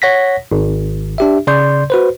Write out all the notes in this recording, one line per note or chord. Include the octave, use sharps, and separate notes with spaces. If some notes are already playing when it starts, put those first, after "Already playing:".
C#5 F#5 A#6 B6
G#1
D4 G4 E5
C#3 D5 C6 G6
F#4 B4 C5